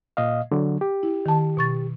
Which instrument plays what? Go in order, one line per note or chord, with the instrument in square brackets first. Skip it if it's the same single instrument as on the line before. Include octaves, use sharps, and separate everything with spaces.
[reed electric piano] A#2 D#5 F5
D3 F#3
G4
[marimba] E4
D#3 A5
B2 C#6 A6